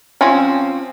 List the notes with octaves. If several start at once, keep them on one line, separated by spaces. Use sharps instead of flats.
F3 C4 C#4